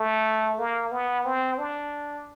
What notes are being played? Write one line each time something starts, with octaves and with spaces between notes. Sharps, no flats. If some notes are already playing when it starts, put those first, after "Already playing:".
Already playing: A3
A#3
B3
C4
D4